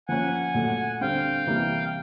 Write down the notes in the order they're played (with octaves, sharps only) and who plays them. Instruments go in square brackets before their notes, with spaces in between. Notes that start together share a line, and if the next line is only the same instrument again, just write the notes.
[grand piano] F3 A#3 C#4 [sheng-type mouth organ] F#5 G#5
[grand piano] A#2 F#3 A3
[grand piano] D3 G3 C4 [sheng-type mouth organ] F5 G5
[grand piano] C3 E3 G3 A#3